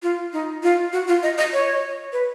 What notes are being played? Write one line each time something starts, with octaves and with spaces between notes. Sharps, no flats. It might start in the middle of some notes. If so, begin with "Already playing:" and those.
F4
D#4
F4
F#4
F4
D#5
D#5
C#5
B4